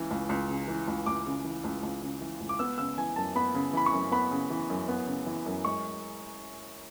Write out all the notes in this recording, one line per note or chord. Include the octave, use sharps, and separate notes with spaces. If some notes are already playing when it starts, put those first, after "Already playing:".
Already playing: C#2 C#3 E3
C#2
C#2
C#3
E3
C#2
C#2 D6
C#3
E3
C#2
C#2
C#3
E3
C#2
D6
B3 E6
C#3 E6
E3 G#5
F#2 A5
B3 B5
C#3
E3 B5
C#6
F#2
B3 B5
C#3
E3
F#2
B3
C#3
E3
F#2
G#3 C#6